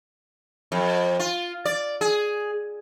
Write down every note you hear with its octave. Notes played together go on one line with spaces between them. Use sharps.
F2
F4
D5
G#4